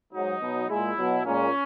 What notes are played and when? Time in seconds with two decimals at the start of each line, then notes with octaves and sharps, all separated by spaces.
0.13 G#2 F#3 D#4
0.41 B2 F#3
0.68 A#2 G#3 E4
0.97 B2 F#3
1.25 A#2 G#3 C#4